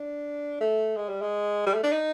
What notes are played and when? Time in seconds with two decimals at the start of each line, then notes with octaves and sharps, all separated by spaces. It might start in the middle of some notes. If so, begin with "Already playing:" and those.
Already playing: D4
0.61 A3
0.96 G#3
1.09 G3
1.21 G#3
1.67 G3
1.74 A3
1.83 D4
1.92 D#4